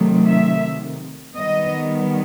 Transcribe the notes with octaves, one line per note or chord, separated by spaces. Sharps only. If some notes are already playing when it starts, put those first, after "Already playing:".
Already playing: C3 D#3 F#3 A3
E5
D#3 G3 B3 D#5